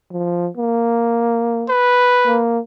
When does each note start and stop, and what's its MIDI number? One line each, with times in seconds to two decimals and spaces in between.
0.12 0.48 53
0.57 1.67 58
1.69 2.41 71
2.26 2.59 58